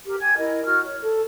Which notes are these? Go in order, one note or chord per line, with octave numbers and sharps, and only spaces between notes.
G4 A#4
G5 G#5 G#6
E4 A#4 D#5
F#4 F6
C#5
A4